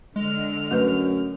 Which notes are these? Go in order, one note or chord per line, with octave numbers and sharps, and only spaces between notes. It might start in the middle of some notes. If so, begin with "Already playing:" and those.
D3 G#3 F6
F#2 A3 B4